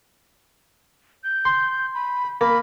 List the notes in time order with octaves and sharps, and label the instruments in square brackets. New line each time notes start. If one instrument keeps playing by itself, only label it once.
[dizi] G6
[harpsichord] C6
[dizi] B5
[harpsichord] A#3 [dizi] B5